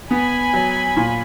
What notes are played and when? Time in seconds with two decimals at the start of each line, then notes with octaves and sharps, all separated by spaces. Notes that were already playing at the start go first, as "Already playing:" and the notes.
0.11 B3 G#5 B5
0.54 F#3
0.97 A#2